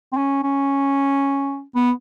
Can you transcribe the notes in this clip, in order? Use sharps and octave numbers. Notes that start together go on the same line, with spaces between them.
C4
C#4
C#4
B3